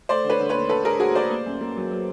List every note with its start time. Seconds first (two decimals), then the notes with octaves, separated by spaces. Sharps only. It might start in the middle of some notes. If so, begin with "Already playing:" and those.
0.09 A3 C5 D5
0.24 D3
0.30 B4 C#5
0.40 D3
0.49 D#2 B4 C#5
0.69 D3 A4 B4
0.85 A3 G#4 A#4
1.00 A3 F#4 G#4
1.15 A3 C5 D5
1.31 A#3
1.46 F#2
1.61 A#3
1.77 F#3
1.91 F#3